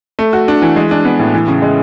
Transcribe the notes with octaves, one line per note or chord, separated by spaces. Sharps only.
A3
F#4
D4
E3
G#3
D4
B3
A2
E3
C#3
G#3